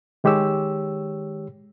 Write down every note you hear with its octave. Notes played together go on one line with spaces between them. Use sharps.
D#3 G#3 G4 C#5 E6